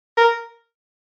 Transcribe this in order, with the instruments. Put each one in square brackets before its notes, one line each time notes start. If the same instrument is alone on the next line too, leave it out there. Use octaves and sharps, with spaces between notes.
[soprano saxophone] A#4